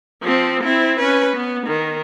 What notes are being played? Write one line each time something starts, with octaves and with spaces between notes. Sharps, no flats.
F3 C4
C4 E4
C#4 B4
B3
D#3